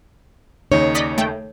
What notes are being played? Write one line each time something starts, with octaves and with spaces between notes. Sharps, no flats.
D#2 C#3 D#4 C#5
D5 D#5 B6
A3 G5